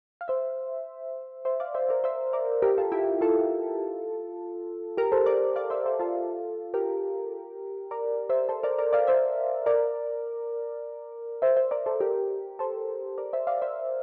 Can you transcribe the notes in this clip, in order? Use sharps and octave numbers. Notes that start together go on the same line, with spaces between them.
F5
C5 E5
C5 E5
D5 F5
C5 E5
A#4 D5
C5 E5
A#4 D5
G4 A#4
F4 A4
E4 G4
F4 A4
G4 A#4
A4 C5
A#4 D5
D5 F5
C5 E5
A4 C5
F4 A4
G4 A#4
A#4 D5
C5 E5
A4 C5
A#4 D5
A#4 D5
D5 F5
C5 E5
A#4 D5
C5 E5
C5 E5
A#4 D5
A4 C5
G4 A#4
A4 C5
A#4 D5
C5 E5
D5 F5
D5
C5 E5